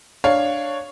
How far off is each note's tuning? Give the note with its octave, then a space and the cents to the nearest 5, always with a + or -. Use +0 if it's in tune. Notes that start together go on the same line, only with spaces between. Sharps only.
D4 +5 C#5 +0 F5 +0